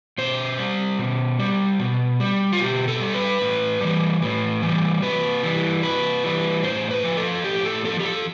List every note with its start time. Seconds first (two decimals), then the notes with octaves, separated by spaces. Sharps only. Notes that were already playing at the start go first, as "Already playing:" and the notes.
0.18 B2 C5
0.59 G3
0.99 B2
1.39 G3
1.79 B2
2.20 G3
2.52 F4
2.60 B2 G4
2.88 A4
3.01 G3
3.14 B4
3.41 A2
3.81 E3 G3
4.22 A2
4.62 E3 G3
5.02 C3 B4
5.43 E3 G3
5.83 C3 B4
6.24 E3 G3
6.63 A2 C5
6.91 B4
7.04 F3
7.17 A4
7.44 A2 G4
7.65 A4
7.85 F3 A4
7.99 G4
8.05 A4